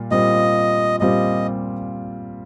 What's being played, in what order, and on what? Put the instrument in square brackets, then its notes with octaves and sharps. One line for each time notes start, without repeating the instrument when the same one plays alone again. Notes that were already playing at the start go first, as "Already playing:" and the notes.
Already playing: [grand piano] A#2 G3 F4
[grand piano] A#2 G3 C4 F4 [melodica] D#5
[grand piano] A#2 G3 C4 F4 [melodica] D#5